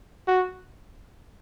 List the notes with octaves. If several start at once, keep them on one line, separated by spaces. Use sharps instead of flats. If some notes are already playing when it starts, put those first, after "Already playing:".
F#4